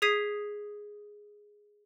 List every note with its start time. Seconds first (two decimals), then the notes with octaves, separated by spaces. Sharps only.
0.02 G#4 D#6 G#6 B6 C7 D#7